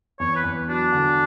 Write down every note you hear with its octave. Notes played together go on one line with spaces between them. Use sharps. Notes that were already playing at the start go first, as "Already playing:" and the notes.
E2 C#5
B4
E2
F#3 D4
D3